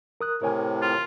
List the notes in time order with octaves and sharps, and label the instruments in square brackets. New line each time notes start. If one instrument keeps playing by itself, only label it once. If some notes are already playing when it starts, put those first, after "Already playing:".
[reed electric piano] A#4 D#6 F#6
[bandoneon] A2 C3 [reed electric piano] A#4 C#5 G#5
[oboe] F4